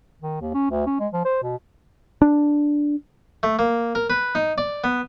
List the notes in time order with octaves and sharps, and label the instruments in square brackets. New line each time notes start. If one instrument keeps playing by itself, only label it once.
[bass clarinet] D#3
D#2
C#4
D2
C#4
G#3
F3
C5
B2
[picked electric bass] D4
[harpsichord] A3
A#3
A#4
B4
D#4
D5
B3